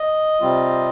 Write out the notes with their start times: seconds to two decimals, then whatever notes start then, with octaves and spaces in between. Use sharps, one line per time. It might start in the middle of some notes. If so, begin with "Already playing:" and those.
Already playing: D#5
0.41 C3 G3 C4 F4